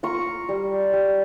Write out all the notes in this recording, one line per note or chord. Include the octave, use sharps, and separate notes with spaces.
F4 A#5 C#6
G3
G3